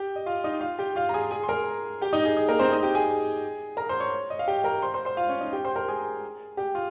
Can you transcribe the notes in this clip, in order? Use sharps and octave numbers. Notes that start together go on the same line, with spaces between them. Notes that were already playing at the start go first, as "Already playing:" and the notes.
Already playing: G4 G5
D#5
F4 F5
D#4 D#5
F4 F5
G4 G5
F4 F5
A#5
G#4 G#5
G#4 G#5
C6
A#4 A#5
G4 G5
D#4 D#5
G#4
G#4
A#3 A#4
C4 C5
D#4 D#5
G4 G5
G#4 G#5
A#4 A#5
C5 C6
C#5 C#6
D#5
F5
G4 G5
A#4 A#5
C5 C6
C5 C6
C5 C6
F4 F5
C#4 C#5
D#4 D#5
G4 G5
C5 C6
A#4 A#5
G#4 G#5
G4 G5
F4